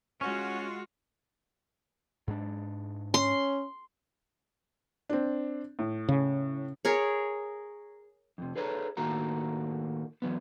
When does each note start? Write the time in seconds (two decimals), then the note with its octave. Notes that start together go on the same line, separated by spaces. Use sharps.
0.21 G#3 C#4 F4 F#4
2.27 G#2 G#3 D4
3.14 C#4 C6
5.09 C4 D4
5.79 A2
6.09 C#3
6.85 G#4 A#4 C#5
8.38 F2 C3
8.56 G#4 A4 B4 C#5 G5 A#5
8.97 A2 D#3 A3 A#3 F#4 A#5
10.22 E3 F#3 B3